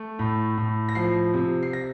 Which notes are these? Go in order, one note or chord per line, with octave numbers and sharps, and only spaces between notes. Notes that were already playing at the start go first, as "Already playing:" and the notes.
Already playing: A3
A2
A2
A#6
F3 C7
C3
C7
A#6